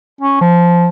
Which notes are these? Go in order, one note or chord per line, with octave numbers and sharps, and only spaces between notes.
C#4
F3